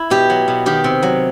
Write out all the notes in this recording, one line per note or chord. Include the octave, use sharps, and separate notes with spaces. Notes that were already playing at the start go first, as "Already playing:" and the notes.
Already playing: E4
B2 G4
F#3
B2
D#3 G4
C3
F#3